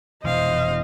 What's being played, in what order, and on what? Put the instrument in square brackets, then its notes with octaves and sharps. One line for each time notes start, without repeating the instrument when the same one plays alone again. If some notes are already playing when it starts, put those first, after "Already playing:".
[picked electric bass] F1 B2 E3 [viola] C5 F5 [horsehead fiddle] D#5